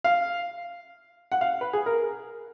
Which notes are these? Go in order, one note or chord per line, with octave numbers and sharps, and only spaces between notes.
F5
F#5
F5
B4
G#4
A#4